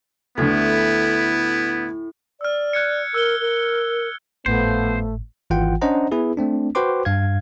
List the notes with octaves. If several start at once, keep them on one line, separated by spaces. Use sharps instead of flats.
D2 A2 D3 B3 E4
D5 E6 F6
F#6 G#6 C#7
A#4 E6 F#6 G7
A#4
G#1 A2 F3 A3 B3 C5
G#1 E3 F4 F#5 G5
C#4 D4 C5 D#5 F#5 A#5
B3 E4 G#4 B4
A3 C4 D4
F#4 B4 C5 G5 C6 D6
G2 F5 G#6